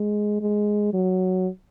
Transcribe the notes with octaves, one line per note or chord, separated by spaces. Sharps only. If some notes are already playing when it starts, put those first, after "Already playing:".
Already playing: G#3
G#3
F#3